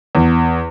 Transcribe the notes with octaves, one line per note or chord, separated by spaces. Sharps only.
E2